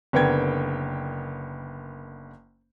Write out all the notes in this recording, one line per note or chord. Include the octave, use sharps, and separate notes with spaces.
F#1 D3 B3 A#4 G5 G#6